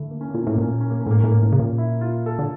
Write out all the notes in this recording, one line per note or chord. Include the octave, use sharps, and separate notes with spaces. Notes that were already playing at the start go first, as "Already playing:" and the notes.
Already playing: D3 A3 E4
A#3
C#4
A#2 A#3
C#4
A2 A#3
A#2 C#4
A#3
C#4
A#3
C#4
A2 A#3
A2 C#4
A#3
A2
C#3
A#2
E4
F4
A4
D3